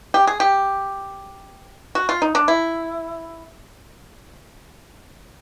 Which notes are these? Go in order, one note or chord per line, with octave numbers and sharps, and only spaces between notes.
G4
G#4
G4
F#4
F4
D#4
D4
E4